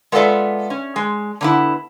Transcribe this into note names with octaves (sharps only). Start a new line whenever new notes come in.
G#3 B3 F4 A4 D5 E5
C#4
G#3
D3 B3 E4